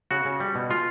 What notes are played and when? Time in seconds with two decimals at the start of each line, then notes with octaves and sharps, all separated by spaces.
0.11 C#3 F#4
0.25 C#3
0.40 G3
0.55 B2
0.70 G#3 F4